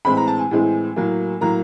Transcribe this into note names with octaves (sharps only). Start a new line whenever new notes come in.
A2 E3 G#3 C4 B5
A#5
A5
G#5
A2 E3 G#3 C4
A2 F#3 A#3
A2 F#3 A#3 A#5